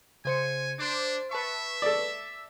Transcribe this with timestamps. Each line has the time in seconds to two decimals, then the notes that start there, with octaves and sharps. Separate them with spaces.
0.25 C#3 C5 G#5 C#7
0.79 D4 C5 D6
1.31 B4 E5 A5 C#6
1.82 A4 D5